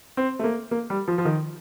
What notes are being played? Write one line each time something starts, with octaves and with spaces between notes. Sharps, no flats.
C4
A3
A#3
A#3
G3
F3
F3
D#3